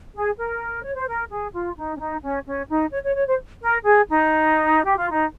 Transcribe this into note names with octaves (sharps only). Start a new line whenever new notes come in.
G#4
A#4
C#5
C5
A#4
G#4
F4
D#4
C#4
D#4
C#4
C#4
D#4
C#5
C#5
C#5
C5
A#4
G#4
D#4
G4
F4
D#4